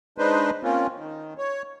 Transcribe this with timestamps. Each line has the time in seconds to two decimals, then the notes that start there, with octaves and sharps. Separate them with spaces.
0.18 G#3 D4 D#4 B4 C5
0.63 A#3 C4 C#4 F4
0.97 D#3
1.38 C#5